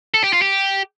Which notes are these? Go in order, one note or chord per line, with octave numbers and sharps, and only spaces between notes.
A4
G4
F4
G4